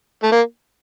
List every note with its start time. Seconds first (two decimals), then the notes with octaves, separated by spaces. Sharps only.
0.23 A3
0.32 A#3